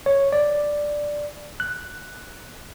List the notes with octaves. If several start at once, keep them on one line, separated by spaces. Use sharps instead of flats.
C#5
D5
F#6